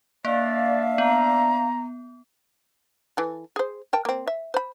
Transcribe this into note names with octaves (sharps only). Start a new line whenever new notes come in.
A#3 D4 D5 E5 F5
B3 A#5
E3 A4
G#4 C5
A#4 G5 A5
A#3 C4
E5
C5 B5